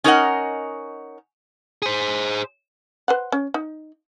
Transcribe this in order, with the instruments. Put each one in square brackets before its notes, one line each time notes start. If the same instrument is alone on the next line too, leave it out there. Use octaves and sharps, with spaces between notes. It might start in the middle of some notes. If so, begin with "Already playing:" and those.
[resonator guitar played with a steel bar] C#4 D#4 A#4 C#5 D#5 F#5
[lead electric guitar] G#4 C5
[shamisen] B4 C5 F#5
C#4
D#4